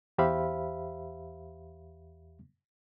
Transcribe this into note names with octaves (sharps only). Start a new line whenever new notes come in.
E2 G4 C5 E5 F5 B5